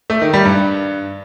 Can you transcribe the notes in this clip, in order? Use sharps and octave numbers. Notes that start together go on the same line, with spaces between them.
A3
D#3
G3
G2